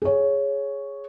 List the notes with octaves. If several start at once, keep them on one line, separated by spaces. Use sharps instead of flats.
G#4 C#5